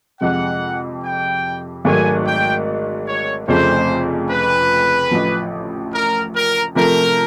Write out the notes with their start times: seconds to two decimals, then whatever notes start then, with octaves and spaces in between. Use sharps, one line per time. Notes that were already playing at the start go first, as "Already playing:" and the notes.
0.21 F2 C3 F3 G#3 F#5
1.03 G5
1.85 G#1 G#2 D#3 F#3 A3 G#5
2.26 G5
3.07 C#5
3.48 F1 F2 C#3 F3 A3 C5
4.29 B4
5.11 A1 A2 F3
5.94 A#4
6.35 A#4
6.75 C3 F3 A3 A#4